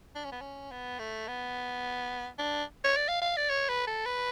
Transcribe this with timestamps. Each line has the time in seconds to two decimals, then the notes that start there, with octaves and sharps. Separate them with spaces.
0.15 D4
0.24 C#4
0.32 B3
0.41 C#4
0.71 B3
0.99 A3
1.27 B3
2.38 D4
2.84 C#5
2.97 D5
3.08 F5
3.22 F5
3.37 D5
3.50 C#5
3.69 B4
3.87 A4
4.06 B4